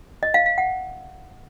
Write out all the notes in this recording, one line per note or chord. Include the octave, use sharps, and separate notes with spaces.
D#5
F5
F5
F#5